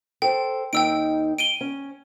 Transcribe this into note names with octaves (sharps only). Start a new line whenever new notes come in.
A4 C5 G5
D#2 D#3 D#4 G5 E6 D7
D7 D#7 G7
C#4